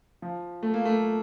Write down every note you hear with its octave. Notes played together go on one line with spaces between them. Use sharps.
F3
A3
A#3
A3